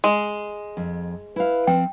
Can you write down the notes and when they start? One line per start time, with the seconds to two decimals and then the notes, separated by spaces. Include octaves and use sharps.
0.04 G#3
0.77 F2
1.36 E4 B4 F5
1.67 F3 C4 G5